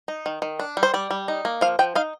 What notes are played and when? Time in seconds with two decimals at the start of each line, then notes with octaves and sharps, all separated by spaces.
0.08 D#4
0.26 D#3
0.42 D#3
0.59 D4
0.77 G3
0.83 C5
0.94 G3 D5
1.11 G3
1.28 D#4
1.45 A#3
1.61 F3 F5
1.79 F3 G5
1.95 D#4 F5